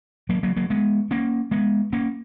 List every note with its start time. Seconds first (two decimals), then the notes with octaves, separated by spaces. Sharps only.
0.29 F#3 A#3
0.43 F#3 A#3
0.56 F#3 A#3
0.70 G#3 B3
1.11 A#3 C#4
1.51 G#3 B3
1.93 A#3 C#4